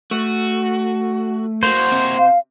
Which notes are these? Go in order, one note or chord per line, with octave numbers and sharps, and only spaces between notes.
A3 F#4
A#3 F#4 C5
C3
F5